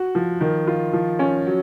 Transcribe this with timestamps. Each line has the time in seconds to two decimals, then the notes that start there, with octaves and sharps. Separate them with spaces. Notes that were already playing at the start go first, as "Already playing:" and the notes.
Already playing: F#4
0.15 F3
0.41 D#3
0.67 F4
0.93 F3
1.19 C#4
1.46 F#3